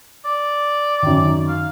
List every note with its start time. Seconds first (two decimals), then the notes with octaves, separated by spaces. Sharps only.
0.25 D5
1.03 F#2 D#3
1.49 F5